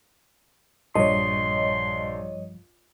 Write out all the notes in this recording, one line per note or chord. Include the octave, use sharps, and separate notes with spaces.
A#1 G2 F3 G3 C#5 D#5 C6